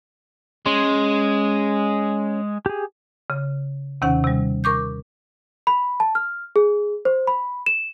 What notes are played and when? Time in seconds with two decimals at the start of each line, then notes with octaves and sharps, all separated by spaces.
0.66 G#3 C#4 C6
2.66 G4 G#4
3.30 C#3
4.02 D#2 C3 D#3 C#4 F#5
4.24 C3 G3
4.64 A#4 C#6 D6 G6
5.67 B5
6.00 A5
6.15 F6
6.56 G#4
7.05 C5
7.27 B5
7.66 E7